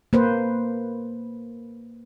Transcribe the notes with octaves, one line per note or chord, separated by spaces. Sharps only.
A#3 B4 C5